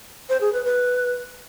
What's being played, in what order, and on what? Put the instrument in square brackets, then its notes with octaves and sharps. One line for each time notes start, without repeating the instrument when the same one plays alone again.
[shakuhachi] C5
G#4
B4
B4